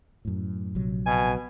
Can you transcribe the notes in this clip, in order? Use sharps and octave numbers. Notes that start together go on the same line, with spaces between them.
F#2 A2
A#1 C3 F#3
B2 G#5